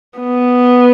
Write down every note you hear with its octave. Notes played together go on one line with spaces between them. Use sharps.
B3